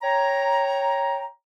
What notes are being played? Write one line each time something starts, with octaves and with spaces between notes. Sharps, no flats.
C#5 G5 A#5